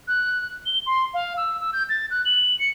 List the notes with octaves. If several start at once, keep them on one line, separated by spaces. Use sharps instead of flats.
F#6
G7
C6
F5
E6
E6
G6
A6
F#6
F#7
C#7